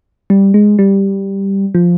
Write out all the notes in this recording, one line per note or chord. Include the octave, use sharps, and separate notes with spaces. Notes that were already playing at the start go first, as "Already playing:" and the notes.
G3
G#3
G3
F3